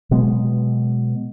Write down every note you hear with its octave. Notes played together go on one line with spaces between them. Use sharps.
B2 F#3 G#3 B3